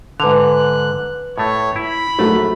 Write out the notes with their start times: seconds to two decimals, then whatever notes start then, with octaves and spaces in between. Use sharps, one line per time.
0.20 G#2 D3 B4 F#6 F7
1.38 A2 A3 C#5
1.76 E4 B5
2.19 A#1 F#3 A3